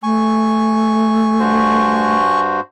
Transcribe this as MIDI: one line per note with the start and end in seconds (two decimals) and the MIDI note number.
0.03 2.15 57
0.03 2.40 80
0.03 2.40 85
1.40 2.60 43
1.40 2.60 66
1.40 2.60 72